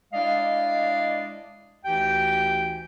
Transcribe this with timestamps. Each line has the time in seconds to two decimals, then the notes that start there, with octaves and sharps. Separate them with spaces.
0.14 G#3 D4 E4 D5 D#5 F5
1.85 D2 E3 D#4 G4 G5